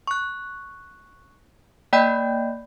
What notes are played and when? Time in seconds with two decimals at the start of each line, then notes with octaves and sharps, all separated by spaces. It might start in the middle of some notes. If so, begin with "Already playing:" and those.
0.07 C#6 F#6
1.93 A#3 D5 D#5 G5 B5 G6